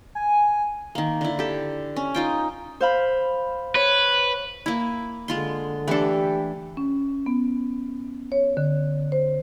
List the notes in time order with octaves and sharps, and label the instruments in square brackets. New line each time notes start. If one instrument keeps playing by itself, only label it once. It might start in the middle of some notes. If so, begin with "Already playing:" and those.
[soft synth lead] G#5
[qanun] D#3 A#3
D3 E4
G4 A4
C#4
D#4 F4 G5
[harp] C5 F5 B5
[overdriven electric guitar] B4 [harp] C#5
[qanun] A#3 E4
[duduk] D3 [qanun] G#3 F4 C6
[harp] E3 D4 [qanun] A3 A4 [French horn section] G4
[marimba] C#4
B3
C#5
D3
C5